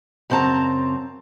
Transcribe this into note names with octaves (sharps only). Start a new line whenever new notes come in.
F#2 C#3 C4 F5 A5 A#5